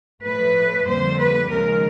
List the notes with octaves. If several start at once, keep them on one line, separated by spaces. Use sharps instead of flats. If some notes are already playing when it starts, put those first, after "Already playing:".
A2 F3 A3 B4
F2 D3 G3 A#3 C5
B4
D#2 C#3 F3 G#3 A#4